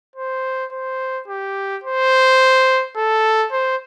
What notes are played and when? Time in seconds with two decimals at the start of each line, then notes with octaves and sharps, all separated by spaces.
0.16 C5
0.72 C5
1.28 G4
1.84 C5
2.97 A4
3.52 C5